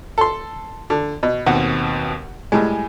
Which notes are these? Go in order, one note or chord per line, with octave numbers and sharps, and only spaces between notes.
A4 C6
D3
B2
D#2 B2 C4 F#5
A2 G3 G#3 G#5